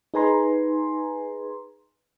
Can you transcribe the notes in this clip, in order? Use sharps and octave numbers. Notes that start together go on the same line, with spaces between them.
D#4 G#4 B4 G#5 A#5 C6